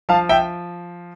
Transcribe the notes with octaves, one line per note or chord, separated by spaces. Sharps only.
F3 F5 A5
E5 G5